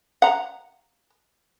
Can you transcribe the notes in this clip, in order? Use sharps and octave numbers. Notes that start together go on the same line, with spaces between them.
F#5 A#5